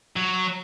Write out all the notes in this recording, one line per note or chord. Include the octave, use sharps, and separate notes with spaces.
F#3